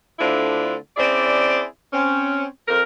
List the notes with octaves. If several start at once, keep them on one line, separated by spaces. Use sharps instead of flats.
D3 A3 C4 D4 E4 F4
C4 C#4 E4 G#4 D5
C4 C#4
F2 A#4